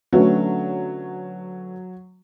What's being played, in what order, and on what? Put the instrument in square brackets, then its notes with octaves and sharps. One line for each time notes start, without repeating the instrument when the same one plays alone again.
[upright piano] D3 A3 C#4 F#4 B4 [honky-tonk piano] F#3